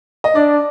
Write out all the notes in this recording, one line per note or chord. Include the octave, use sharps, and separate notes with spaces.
D#5
D4 D5